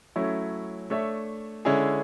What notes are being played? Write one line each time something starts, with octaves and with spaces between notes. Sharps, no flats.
F#3 A3 C#4 E4
A3 D4 A4 C#5 E5
D3 G#3 C#4 E4 G#4